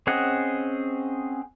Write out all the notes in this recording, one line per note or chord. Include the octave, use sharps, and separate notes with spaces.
C4 C#4 G#4 D#5 F#5